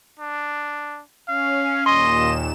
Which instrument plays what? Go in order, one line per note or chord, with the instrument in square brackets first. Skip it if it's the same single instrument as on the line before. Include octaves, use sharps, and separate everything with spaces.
[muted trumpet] D4
[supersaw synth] C#4 [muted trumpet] F5
[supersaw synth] D#2 A#2 E7 [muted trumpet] D#5 [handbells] C6